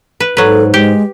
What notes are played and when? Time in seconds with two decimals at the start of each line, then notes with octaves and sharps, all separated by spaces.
0.20 B4
0.37 G#2 F#3 A4 B4
0.74 G#3 G4